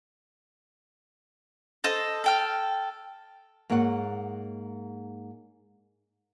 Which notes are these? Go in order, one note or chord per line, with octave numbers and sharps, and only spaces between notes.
A4 C5 D#5
A4 G5 F6
G#2 A#3 G#4 C#5 F#5